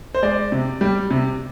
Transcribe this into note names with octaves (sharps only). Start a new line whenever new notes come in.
C5
G#3 D5
C3
G3
C3